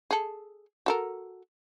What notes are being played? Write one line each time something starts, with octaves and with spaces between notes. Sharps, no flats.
G#4 A4
F#4 A4 A#4